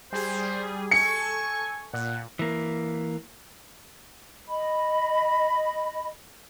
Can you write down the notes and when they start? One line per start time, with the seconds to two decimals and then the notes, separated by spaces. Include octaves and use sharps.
0.12 G3 G#4 C5
0.91 A4 G#5 C#6 C#7
1.93 A#2 F#5
2.39 E3 A#3
4.49 D#5 B5